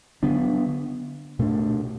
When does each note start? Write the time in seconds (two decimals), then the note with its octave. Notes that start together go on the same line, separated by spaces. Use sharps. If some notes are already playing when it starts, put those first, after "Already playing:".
0.22 D3 F#3 B3 D4
1.39 B2 A3 D4